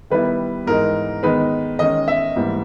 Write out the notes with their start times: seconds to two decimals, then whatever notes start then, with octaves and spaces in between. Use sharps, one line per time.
0.10 D#3 G3 B3 E4 B4
0.67 G#2 E3 G#3 D#4 A#4
1.23 D#3 G#3 B3 D#4 B4
1.79 D#3 G#3 C#4 D#5
2.08 E5
2.36 G#2 E3 G3 A#3